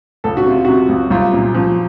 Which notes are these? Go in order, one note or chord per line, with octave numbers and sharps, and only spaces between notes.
C#2 A4
F#4
C3 F4
C3 F#4
C#2
C2 F4
A#2
F3